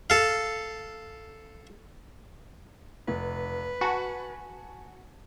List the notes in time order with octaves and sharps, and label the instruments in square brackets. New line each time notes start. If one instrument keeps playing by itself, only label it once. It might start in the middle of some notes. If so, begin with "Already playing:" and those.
[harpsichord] A4 F5
[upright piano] F1 [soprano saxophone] B4
[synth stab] F#4 [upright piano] G#5 A5